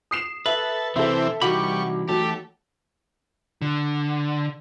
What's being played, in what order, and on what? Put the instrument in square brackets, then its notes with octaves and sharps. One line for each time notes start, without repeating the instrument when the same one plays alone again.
[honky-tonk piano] D#6 C7 E7
[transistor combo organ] A4 [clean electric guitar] B4 [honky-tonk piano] E5
[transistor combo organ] C3 C4 E4 [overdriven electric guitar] E3 [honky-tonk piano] A4 E5
[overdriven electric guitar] C2 [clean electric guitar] E3 D#4 B5 [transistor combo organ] G3 C#6 [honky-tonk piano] F#4 D6
[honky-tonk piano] F#3 [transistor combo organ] A3 [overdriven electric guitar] G4
[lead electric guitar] D3